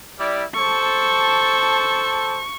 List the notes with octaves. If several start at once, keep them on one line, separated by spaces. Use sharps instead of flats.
G3 E4 D5
A4 C5 A5 C#6